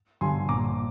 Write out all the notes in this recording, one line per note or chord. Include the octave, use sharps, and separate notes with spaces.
G2 D3 G#5 C6
A#1 A#5 D6